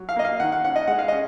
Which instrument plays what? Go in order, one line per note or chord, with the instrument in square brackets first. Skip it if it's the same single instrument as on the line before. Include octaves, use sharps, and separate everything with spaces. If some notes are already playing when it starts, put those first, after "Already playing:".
Already playing: [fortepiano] F#3
F5
A#3 D#5
F5
D#3 F#5
F#5
C#4 F#5
D#5
G#3 F#5
F5
C#4 D#5